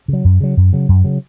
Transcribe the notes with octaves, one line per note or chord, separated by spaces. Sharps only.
C#3 F#3
F#2
C#3 F#3
F#2
C#3 F#3
F#2
C#3 F#3